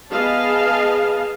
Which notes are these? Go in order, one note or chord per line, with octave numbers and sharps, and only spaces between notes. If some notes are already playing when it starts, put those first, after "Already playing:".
B3 G#4 B4 D#5 F5 A5